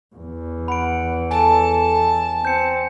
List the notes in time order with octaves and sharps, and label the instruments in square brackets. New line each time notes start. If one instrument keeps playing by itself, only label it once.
[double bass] E2
[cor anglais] F#5 [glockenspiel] B5 D7
[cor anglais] A4 [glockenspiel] G#5 [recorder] A5
[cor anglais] C4 [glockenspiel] G6 C#7